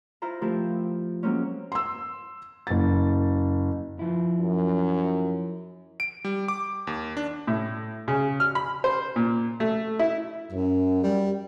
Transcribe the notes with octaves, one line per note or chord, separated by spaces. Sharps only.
E4 F4 C5 A#5
F3 A3 C4 E4 G4 A#4
F#3 G#3 A#3 C4 C#4
C6 E6
F#1 A6
F3 E4
F#2
D7
G3
D6
D#2
D4
A2
C#3
F6
B5
C5
A#2
A3
E4
F#2
G3